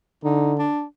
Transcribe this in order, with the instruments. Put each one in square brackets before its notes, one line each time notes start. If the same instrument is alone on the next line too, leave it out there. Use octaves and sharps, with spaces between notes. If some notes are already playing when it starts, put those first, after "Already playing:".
[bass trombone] D3 [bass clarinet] D#4
[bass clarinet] D4